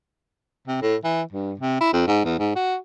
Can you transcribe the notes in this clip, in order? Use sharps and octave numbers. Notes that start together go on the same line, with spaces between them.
C3
A2
E3
G2
C3
E4
F2
G#2
E2
G#2
F#4